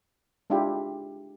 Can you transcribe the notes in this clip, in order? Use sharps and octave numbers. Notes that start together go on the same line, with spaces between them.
G#3 D4 E4 F4 G4